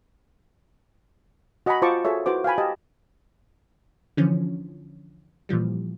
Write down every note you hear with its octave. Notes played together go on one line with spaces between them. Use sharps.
F#4 D#5 F#5 G#5 A#5 B5
F4 C5 A5 C#6 D6
F#4 G#4 A4 C#5 E5
E4 F#4 B4 C5 D6
F5 G5 G#5 B5
G4 D#5 A5
D3 E3 F3 C#4
A#2 E3 F3 G3